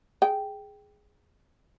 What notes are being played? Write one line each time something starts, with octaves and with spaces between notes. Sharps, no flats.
G#4 G5